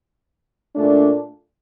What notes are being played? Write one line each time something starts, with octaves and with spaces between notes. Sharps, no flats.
A#2 A3 D4